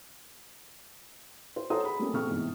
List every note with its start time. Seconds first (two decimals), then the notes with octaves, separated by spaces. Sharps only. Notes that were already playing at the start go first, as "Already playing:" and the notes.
1.56 C5
1.70 A4 C5 C#5 F#5 A#5 D#6
1.84 G#4 B5
1.99 G3 A3 A#3 C4 C#4
2.13 A#1 A3 B3 C4 C#6 F6
2.29 E2 G#2 C3 E3